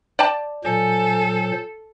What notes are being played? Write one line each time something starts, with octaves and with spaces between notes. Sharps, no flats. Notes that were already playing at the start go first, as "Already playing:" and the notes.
D5 G5 A5
A#2 F#3 A4 C5 G#5